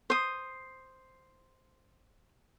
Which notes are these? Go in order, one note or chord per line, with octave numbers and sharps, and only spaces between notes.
C5 D#6